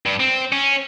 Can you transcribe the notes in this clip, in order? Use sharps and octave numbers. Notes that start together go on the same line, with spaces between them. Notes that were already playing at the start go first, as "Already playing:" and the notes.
G2
C4
C#4